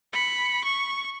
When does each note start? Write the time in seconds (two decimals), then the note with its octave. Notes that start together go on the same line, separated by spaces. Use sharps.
0.13 B5 C#7
0.65 C#6